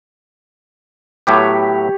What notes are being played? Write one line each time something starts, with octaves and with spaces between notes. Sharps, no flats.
A2 F#3 B3 G4 C#5